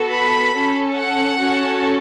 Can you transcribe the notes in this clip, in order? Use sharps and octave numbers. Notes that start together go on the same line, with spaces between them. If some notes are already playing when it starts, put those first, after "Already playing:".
Already playing: B3 F#4 A4
B5
C#4 A4
F#5
C#4 F#4 A4